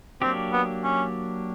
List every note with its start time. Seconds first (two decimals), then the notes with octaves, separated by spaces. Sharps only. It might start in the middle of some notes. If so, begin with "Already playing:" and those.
0.22 F#3 A#3 C4 D4 G4
0.52 B3
0.84 C#4